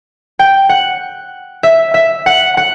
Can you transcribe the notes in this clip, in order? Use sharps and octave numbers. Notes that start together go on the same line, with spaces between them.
G5
F#5
E5
E5
F#5
F#5